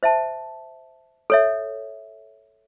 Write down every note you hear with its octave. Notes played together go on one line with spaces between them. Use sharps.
C5 E5 A5
A4 C#5 E5